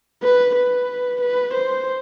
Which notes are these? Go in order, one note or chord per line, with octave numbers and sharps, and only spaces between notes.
B4
B4
B4
C5